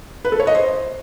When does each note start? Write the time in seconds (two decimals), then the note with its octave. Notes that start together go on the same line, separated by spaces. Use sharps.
0.25 B4
0.32 A4
0.40 C#5
0.47 D#5
0.55 C5